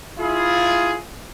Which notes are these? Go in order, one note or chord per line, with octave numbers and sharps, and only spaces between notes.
E4 F4 G#4